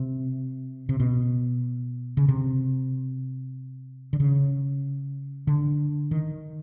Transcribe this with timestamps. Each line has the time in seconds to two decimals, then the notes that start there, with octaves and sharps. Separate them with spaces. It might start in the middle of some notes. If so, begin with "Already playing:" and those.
Already playing: C3
0.89 C3
1.00 B2
2.17 C#3
2.28 C3
4.13 D3
4.20 C#3
5.47 D3
6.11 D#3